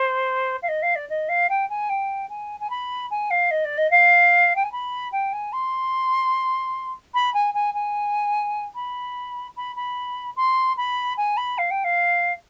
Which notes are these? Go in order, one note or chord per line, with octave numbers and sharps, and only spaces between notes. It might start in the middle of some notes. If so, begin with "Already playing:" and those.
Already playing: C5
F5
D#5
F5
D5
D#5
F5
G5
G#5
G5
G#5
G#5
B5
G#5
F5
D#5
D5
D#5
F5
G5
G#5
B5
G5
G#5
C6
B5
G#5
G#5
G#5
B5
B5
B5
C6
B5
G#5
B5
F5
G5
F5